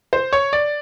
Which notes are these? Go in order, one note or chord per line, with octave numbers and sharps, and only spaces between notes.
C5
C#5
D5